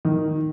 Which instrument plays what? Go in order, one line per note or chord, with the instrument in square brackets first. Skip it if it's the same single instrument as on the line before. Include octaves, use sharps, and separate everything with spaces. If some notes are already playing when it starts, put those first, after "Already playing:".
[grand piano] D#3